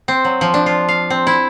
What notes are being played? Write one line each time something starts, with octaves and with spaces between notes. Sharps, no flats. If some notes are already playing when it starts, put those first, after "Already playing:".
C4
F#3
F3
D4
F4
F5
C4
E4